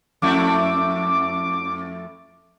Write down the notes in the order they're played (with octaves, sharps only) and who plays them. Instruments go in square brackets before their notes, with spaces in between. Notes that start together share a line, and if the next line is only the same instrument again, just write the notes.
[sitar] F2 A3 E4 [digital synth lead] D6